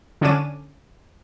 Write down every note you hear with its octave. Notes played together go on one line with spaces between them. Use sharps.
D3 C#4 D4 C#5 D6 D#7